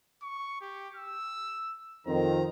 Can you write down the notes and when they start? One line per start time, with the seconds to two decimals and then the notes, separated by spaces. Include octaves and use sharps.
0.23 C#6
0.61 G4
0.96 E6
2.07 F2 D#3 C4 A#5